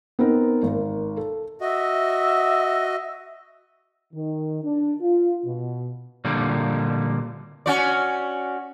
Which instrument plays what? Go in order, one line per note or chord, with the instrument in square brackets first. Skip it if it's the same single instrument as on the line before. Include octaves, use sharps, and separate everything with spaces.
[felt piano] B3 C4 D#4 A#4
G#1 A#4
A4
[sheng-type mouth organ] F#4 D#5 [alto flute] E5
[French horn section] D#3
D4
F4
B2
[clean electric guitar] A#2 D3 F3 G3 A#3
[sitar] C#4 F#4 D5